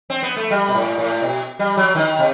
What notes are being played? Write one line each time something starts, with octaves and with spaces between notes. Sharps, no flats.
C4
B3
A3
G3
B2
A2
A2
B2
G3
F#3
D#3
C3